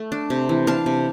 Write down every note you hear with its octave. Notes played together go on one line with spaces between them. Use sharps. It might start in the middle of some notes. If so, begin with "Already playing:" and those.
Already playing: A3
D4
C3
E3
D4 F5 A5
C3